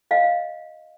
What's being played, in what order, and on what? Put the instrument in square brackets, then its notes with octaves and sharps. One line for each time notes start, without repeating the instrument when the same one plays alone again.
[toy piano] D#5 F5